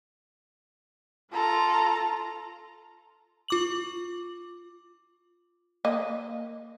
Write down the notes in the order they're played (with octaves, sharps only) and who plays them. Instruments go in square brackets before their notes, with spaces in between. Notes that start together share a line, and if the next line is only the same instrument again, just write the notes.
[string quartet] F4 A4 A#5
[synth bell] F4 D6 F#7
[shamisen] A#3 D#5